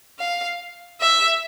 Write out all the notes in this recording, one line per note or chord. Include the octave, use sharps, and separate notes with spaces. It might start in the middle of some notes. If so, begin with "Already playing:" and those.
F5
E5